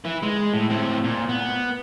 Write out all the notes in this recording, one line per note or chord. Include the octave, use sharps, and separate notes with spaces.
E4 B4
G#3
A2
A2 C4
A#2
B3